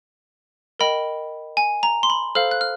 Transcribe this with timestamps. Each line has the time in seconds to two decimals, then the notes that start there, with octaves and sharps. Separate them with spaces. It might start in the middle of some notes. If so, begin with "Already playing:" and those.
0.79 A#4 D#5 G5 B5
1.57 G#5
1.83 A#5
2.03 C6
2.10 B5
2.35 A4 C5 F5 F6
2.51 F#6
2.61 F6